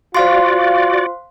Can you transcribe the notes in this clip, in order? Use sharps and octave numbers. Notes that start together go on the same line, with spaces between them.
F4 F#4 C5 D5 F5 C6